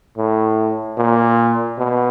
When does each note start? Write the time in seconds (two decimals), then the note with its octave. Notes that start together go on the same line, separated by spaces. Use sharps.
0.18 A2
0.97 A#2
1.78 B2